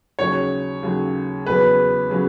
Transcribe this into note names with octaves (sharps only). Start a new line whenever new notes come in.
D#2 C#3 F#3 C#5
D#2 C#3 F#3
E2 C#3 F#3 C#4 B4
C#3 F#3 C#4